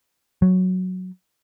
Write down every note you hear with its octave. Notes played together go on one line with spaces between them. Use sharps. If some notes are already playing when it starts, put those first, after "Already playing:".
F#3